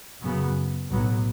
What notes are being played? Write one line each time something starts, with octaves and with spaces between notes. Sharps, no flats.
F#2 C#3 F#3 B3
B1 A2 F#3 B3